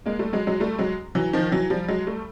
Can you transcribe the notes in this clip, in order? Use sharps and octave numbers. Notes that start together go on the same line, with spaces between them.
G#3 A#3
G3 A3
F#3 G#3
F#3 G#3
G3 A3
F#3 G#3
E3 F#3
D#3 F3
E3 F#3
F3 G3
F#3 G#3
G3 A3